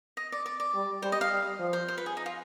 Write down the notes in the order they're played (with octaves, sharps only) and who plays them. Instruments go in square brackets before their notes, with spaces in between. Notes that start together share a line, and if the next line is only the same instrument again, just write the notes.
[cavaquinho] D#5
D5
D5
D5
[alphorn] G3
[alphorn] G3 [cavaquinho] C5
[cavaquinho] D#5
F5
[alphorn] G3
F3
[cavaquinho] C5
C5
B4
G#4
D#4
F4